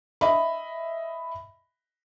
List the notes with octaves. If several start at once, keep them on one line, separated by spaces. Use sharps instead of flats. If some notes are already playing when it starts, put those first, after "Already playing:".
D#5 E5 B5